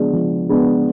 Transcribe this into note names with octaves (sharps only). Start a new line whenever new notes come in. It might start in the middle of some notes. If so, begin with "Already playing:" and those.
Already playing: F3 G#3 B3 D4
F3
G#3 B3 D4